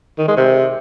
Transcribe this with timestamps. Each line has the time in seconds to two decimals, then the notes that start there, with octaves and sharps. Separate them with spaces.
0.18 D#3
0.28 G#3
0.37 C3